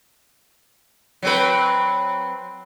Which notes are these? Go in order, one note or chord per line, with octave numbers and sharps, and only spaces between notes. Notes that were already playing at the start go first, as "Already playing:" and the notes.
F#3 C4 B4